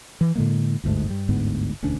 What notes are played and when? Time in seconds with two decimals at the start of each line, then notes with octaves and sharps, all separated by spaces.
0.21 E3
0.35 A2 D3 G#3 A#3
0.84 G1 D2 G#2 A3
1.09 G2 G3
1.29 G1 D2 G#2 B3
1.82 E1 D2 C#4 D4